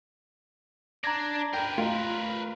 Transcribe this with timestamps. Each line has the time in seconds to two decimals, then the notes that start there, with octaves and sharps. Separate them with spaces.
1.04 D4 D5 A#5 G#6 A#6
1.53 A#4 B4 G5
1.78 A3 F4